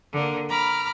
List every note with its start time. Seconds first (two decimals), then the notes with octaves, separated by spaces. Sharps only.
0.12 D3 A#3
0.48 A#5 B5 D6 F6